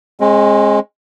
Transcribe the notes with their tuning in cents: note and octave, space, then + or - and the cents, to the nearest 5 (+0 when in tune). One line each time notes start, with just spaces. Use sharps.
G#3 +0 C4 +45